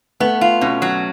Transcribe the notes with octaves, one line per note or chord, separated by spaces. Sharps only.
A3 B3
F4
B2 C#4
F#3